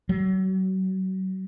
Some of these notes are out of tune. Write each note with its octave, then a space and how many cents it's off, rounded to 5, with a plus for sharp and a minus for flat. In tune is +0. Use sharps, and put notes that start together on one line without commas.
F#3 +35